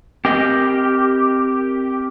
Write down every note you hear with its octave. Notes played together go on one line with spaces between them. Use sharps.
C4 G4 A#4 D#5